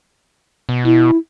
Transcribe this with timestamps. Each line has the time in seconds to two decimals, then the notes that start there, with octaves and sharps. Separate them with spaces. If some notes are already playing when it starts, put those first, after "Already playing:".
0.69 B2
0.85 B2 E4